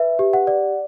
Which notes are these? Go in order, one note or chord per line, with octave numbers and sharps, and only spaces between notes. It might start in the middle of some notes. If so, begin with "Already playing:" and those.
Already playing: B4 E5
G4
F#5
D5